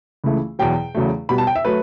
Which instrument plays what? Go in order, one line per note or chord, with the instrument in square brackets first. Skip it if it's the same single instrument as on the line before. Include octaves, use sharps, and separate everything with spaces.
[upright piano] C#2 C#3 E3 A3
E2 B2 F#3 G5
E2 C#3 F#3 A3
B2 G3 B3 B5
A5
G5
E5
F#3 A3 B4